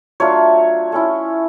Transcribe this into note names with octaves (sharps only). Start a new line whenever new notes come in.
F#3 A3 D4 F4 C#5
A3 C#4 E4